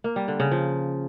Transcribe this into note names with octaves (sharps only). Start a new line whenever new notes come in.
A#3
G3
D3
C#3
F3